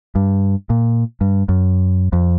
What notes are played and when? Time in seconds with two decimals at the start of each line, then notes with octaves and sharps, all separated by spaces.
0.15 G2
0.70 A#2
1.21 G2
1.49 F#2
2.13 F2